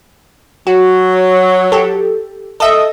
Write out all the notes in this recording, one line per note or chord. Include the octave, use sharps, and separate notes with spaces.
F#3 F#4
G4 A4
A4 D#5 E5